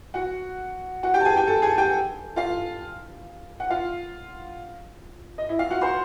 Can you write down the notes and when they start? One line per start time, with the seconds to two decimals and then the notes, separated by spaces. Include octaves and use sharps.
0.14 F#4 F#5
1.03 F#4 F#5
1.14 G4 G5
1.20 A5
1.25 G#4 G#5
1.36 G4 G5
1.47 A4 A5
1.62 G#4 G#5
1.77 G4 G5
2.36 F4 F5
3.60 F#5
3.70 F4 F5
5.38 D#5
5.49 E4 E5
5.59 F4 F5
5.70 F#4 F#5
5.81 C5 C6